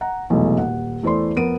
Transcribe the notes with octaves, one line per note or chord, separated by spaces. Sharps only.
F#5 A#5
F1 B1 E2 G#3 A3
D#1 F#5
E2 A3 E4 C5 D5 C6
F2 B3 A#4 D7 D#7